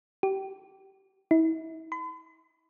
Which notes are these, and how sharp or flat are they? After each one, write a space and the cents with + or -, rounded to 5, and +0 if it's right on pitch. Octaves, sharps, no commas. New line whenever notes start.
G4 -25
E4 -35
B5 +45